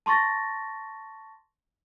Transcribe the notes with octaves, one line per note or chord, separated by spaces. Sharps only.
A5 C6 C#6 A6 A#6